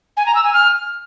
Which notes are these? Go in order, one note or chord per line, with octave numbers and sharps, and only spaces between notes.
G#5
A#5
E6
G#5
F6